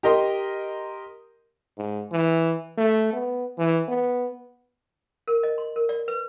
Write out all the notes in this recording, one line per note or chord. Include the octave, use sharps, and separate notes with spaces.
G4 A#4 D#5 C6
G#2
E3
A3
B3
E3
B3
A#4
D#5
C6
A#4
D5
B4